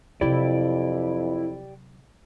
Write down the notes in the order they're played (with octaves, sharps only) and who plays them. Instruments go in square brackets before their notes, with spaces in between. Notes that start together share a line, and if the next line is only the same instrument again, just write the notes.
[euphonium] F2 [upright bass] C3 F#3 [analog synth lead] E4 [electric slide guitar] G4 D5